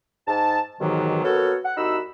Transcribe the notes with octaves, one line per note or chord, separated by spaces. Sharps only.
G#2 A5
D#2 G#2 B2 D#3 E3 F#3
A#3 B3 F#4 A4 A#4 C#5
F#5
C2 D#4 F#4 B5 E6